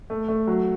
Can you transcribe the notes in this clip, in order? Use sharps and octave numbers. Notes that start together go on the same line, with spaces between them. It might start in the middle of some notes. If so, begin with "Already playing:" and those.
A3
A3
F#3